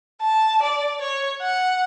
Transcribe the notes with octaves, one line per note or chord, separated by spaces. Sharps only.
A5
D5
C#5
F#5